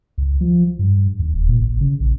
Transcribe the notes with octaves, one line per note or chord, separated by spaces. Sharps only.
C#2
F3
G2
D#2
D1
A#2
G#1
C#3
A#1